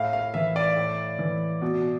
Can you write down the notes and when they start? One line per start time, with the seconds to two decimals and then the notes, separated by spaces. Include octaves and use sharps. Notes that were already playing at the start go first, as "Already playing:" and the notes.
Already playing: A2 F5
0.13 F5
0.34 E3 E5
0.56 D5
0.76 A2
1.19 E3
1.62 B2